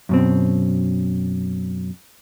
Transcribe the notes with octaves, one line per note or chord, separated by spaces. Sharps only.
F#2 B2 C4